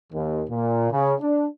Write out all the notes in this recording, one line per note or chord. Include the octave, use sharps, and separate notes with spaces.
D#2
A#2
C#3
D4